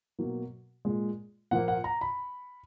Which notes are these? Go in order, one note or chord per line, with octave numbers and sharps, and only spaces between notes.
B2 F#3 A#3
A#2 G#3
A#2 F3 A#3 F#5
F#5
A#5
B5